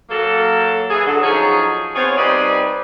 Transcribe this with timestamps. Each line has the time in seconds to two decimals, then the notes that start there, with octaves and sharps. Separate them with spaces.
0.10 F#3 A#3 A4
0.90 E3 G#4
1.05 D3 F#3 A4
1.23 F3 F#3 C#4 D#4 G#4
1.94 B3 C4 F4 G#4 C#5
2.18 G3 C4 D#4 G#4 B4 D5